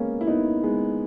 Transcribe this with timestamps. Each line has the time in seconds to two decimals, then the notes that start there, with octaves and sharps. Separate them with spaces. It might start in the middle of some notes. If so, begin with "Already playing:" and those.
Already playing: G#3 A#3 B3 C#4
0.21 E4
0.27 B3 D#4
0.63 G#3 B3